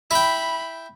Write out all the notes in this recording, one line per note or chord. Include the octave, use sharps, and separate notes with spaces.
E4 G5 B5